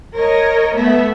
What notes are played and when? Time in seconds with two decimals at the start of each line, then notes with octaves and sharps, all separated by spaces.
0.15 A#4 C#5 D#5
0.74 A3 B3 E5